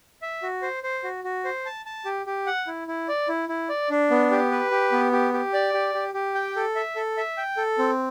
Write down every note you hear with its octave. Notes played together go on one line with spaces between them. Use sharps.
E5
F#4
C5
C5
F#4
F#4
C5
A5
A5
G4
G4
F#5
E4
E4
D5
E4
E4
D5
D4
B3
G4
B4
G4
B3
G4
G4
D5
G4
G4
G4
G5
A4
E5
A4
E5
G5
A4
C4